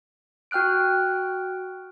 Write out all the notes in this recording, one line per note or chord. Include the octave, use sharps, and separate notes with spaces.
F#4 G5 F6 F#6 D7